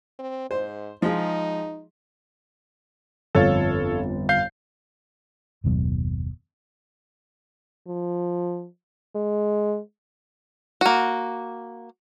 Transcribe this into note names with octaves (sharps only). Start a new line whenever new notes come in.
C4
G#2 C5
F3 G#3 D#4 F4
G1 F2 A4 C#5 F5 A6
F5 G6 C7
F#1 D#2 B2 F#3
F3
G#3
A#3 F#4